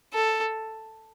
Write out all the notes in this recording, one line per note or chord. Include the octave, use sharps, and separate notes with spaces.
A4